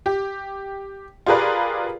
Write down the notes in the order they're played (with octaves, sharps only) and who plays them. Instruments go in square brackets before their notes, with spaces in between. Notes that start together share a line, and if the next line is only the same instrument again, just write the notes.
[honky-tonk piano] G4
F4 G4 G#4 A#4 B4 D5